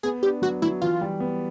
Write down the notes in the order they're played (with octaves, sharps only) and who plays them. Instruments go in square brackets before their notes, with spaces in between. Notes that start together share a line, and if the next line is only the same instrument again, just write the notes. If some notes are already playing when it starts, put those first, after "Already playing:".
[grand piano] B3 [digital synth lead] G#4
[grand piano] D4 [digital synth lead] G4
[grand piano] F#3 [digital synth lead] F#4
[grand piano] F#3 [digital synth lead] E4
[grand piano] E3 [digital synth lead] F4
[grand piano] G3
B3